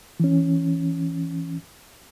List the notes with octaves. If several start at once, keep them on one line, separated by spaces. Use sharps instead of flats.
E3 C#4